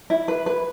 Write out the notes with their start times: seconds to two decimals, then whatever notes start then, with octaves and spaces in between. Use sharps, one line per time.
0.10 E4
0.28 B4
0.46 B4